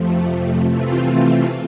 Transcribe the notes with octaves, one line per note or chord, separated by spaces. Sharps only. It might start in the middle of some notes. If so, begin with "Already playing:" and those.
Already playing: F2 C3 F3 A3
C3 E3 A3 C4 F4